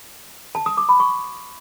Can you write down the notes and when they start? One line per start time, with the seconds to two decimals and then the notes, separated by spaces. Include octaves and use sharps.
0.55 A5
0.66 D#6
0.77 D6
0.89 B5
1.00 C#6